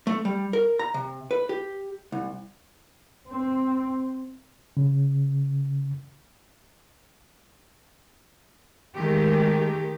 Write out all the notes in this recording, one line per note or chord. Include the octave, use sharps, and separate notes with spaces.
A3
G3
A#4
A#5
C3
B4
G4
C2
C4
C#3
D#3 G#3 A3 G4